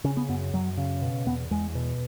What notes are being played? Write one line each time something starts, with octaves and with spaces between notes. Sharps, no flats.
C#3 C#4
B3
F#2 B3
F#2 F#3
C#3
B2
E2 B3
E2 G#3
B2